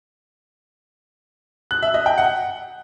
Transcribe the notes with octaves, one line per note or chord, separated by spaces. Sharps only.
F#6
E5
D#5
G5
F#5